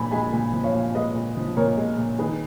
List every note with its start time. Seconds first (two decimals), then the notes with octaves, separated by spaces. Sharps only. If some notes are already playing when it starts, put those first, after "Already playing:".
Already playing: A#2 F3 G#5 B5
0.11 G#3 G#5 B5
0.32 A#2
0.53 F3
0.64 C#5 F5
0.74 A#2
0.95 G#3 B4 D#5
1.15 A#2
1.37 F3
1.56 A#2 A#4 C#5
1.77 G#3
1.98 A#2
2.19 D#3 G#4 B4